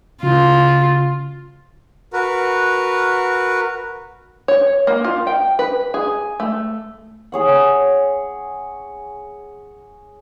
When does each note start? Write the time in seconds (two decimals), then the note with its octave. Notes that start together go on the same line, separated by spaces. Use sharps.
0.23 C#3 F4
2.13 F#4 A#4 B4
4.48 C#5
4.87 A#3
5.04 F4
5.27 G5
5.59 B4
5.94 G#4
6.40 A3
7.32 G#4 C#5 F#5